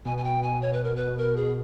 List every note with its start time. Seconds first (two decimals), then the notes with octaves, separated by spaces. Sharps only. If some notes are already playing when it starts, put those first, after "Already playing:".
0.05 B2 G#5
0.18 G#5
0.24 G5
0.43 G#5
0.62 C#5
0.73 B4
0.84 A#4
0.96 B4
1.18 A#4
1.37 G#4